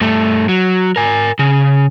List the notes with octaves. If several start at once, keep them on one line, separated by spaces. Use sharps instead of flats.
G2 A3
F#3
A#4 G#5
C#3